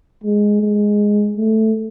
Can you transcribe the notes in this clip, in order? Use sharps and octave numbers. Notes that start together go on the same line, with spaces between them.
G#3
G#3
A3